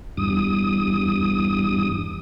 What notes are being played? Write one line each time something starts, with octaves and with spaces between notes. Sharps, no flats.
E2 G2 D#6